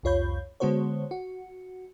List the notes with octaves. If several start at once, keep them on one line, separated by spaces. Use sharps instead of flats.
C2 F2 F4 C#5 B5 G6
D3 G#3 B3 F#4 C5 C#5
F#4